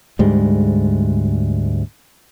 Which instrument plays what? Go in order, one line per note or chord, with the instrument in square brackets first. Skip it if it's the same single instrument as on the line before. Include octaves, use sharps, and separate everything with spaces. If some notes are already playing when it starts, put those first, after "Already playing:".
[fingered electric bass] D2 G#2 G3 G#3